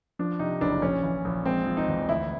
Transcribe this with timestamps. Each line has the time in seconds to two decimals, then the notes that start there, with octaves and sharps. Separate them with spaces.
0.19 F3 D4
0.39 C3 D#4
0.61 F#1 D4
0.82 A#1 C#4
1.03 E3
1.25 A#1
1.45 G#3 C4
1.66 F3
1.77 D#4
1.88 E2
2.08 D2 E4